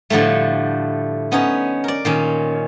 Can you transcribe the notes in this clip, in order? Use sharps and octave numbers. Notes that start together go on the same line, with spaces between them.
A2 D3 F3 G3 A3
B3 C#4 D#4 C#5
A#4 D5
A#2 D#3 C#4